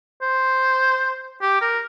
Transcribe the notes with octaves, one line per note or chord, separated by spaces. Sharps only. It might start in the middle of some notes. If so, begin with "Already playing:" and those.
C5
G4
A#4